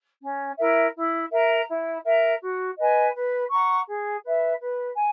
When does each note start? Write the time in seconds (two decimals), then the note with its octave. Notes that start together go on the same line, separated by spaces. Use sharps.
0.21 C#4
0.57 E4 A#4 E5
0.95 E4
1.31 A#4 E5 A#5
1.68 E4
2.03 A#4 E5 A#5
2.40 F#4
2.78 B4 D#5 G#5
3.14 B4
3.50 F#5 A#5 C#6
3.86 G#4
4.23 B4 E5
4.60 B4
4.96 G#5